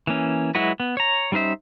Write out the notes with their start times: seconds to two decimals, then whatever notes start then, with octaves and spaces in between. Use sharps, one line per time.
0.07 E3 A#3 C#4
0.55 F#3 G#3 E4 F#4 B4
0.80 B3
0.97 C#5 A#5
1.32 G3 C#4 D#4 C5 E5